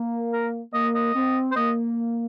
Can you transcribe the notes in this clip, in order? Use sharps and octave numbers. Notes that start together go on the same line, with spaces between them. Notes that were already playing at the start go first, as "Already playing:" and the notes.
Already playing: A#3
A#4
A#3 D#5
D#5
C4
C5
A#3 D#5